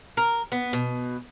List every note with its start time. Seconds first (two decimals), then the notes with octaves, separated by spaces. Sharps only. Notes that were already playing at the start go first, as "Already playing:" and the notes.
0.17 A#4
0.52 B3
0.73 B2